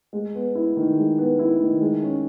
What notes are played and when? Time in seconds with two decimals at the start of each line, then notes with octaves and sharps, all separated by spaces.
0.13 G#3
0.34 B3
0.55 E4
0.77 D#3
0.98 G#3
1.18 B3
1.39 E4
1.60 D#3
1.81 G#3
2.02 C#4